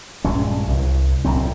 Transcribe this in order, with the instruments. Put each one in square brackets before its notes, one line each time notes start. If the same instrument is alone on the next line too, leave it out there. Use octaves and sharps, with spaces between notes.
[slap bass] A#1 G2 G#3 C#4
C2
D1 C2 F#3 C4